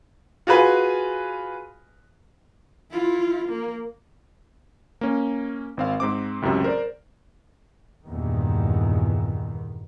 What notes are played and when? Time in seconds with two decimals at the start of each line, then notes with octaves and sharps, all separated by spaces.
0.47 F4 F#4 G#4 B4 G#5
2.91 E4 F4
3.49 A#3
5.01 A#3 C#4
5.77 G#1 C4 F5
6.00 G#2 C4 D6
6.42 C#2 F#2 A2 C3
6.64 A#4 C5 D5
8.07 E2 G2 A#2 D#3